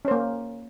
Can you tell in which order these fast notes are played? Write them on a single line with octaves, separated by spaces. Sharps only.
C#4 C5 A#3